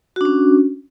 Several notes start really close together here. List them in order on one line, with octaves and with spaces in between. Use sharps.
F#4 D4 C#4